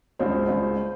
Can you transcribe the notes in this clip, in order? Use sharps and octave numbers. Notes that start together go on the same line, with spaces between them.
C#2 C5
C#2